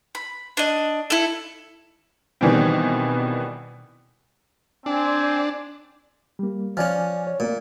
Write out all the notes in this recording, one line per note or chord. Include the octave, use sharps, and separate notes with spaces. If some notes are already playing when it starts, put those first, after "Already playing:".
B5
D4 D#5
E4 A4
B2 D#3 E3 G3 C4
C4 D4 G#5
G3 A#3
F3 C#4 D5 G#5 F6
C#5
A#2 A3 A#3